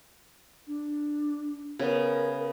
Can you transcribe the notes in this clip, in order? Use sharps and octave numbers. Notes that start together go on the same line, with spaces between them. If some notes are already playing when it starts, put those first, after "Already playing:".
D4
C#3 B3 A#4